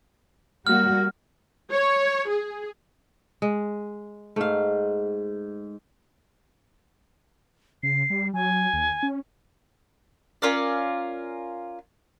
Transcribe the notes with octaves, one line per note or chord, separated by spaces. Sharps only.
G3 A#3 F#4 F6
C#5
G#4
G#3
G#2 A3 F5
C#3 C7
G3
F#3 G#5
D#2
C#4
C#4 F4 A#4 D5